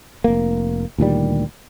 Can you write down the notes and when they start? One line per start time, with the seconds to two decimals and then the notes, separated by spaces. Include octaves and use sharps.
0.24 F1 A#3
0.98 D2 A#2 D#3 G3